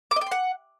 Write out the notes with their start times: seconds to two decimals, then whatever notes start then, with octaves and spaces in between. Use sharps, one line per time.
0.11 D6
0.16 D#5
0.21 G5
0.26 C6
0.31 F#5